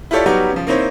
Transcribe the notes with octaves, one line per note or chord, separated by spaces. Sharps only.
E4 F4 G4 A4 C#5 D5
F#3 G3 B3 D#4 F#4 G4
C#3 F3
A#3 C4 D#4 E4 C5 C#5